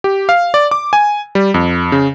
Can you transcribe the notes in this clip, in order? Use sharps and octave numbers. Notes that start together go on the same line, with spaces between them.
G4
F5
D5
D6
G#5
G3
F2
C#3